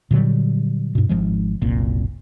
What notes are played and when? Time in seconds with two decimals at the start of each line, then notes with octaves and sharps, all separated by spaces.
0.11 A#2 D3 F#3 G3
0.95 G2 B2
1.09 G#1 D2 F3 G#3
1.62 F#1 C2 A#2